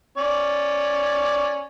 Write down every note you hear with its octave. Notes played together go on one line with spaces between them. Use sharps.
C#4 D5